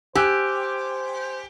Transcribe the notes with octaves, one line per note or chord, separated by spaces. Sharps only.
G4 C5 G#5 E6 F#6